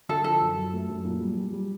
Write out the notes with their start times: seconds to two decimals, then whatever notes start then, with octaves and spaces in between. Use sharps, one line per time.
0.09 D3 A4
0.24 F3 A4
0.41 F#2
0.57 F#2
0.73 A3
0.89 F#2
1.05 A#2
1.21 G3
1.37 G3
1.53 G3